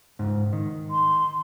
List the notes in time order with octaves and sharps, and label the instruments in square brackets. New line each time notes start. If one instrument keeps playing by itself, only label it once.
[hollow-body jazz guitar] C#2 G#2
D#3
[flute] C6